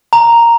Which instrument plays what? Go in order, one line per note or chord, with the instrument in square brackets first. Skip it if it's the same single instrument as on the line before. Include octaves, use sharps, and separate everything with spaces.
[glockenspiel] A#5